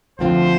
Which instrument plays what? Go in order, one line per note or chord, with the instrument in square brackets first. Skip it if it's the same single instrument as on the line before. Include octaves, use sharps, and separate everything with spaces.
[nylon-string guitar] D2 D3 F3 C4 F4 [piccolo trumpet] C5